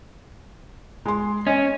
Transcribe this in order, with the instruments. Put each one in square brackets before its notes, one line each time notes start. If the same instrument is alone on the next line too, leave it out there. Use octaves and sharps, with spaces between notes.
[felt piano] G#3 C6
[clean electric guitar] C#4 [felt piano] D#5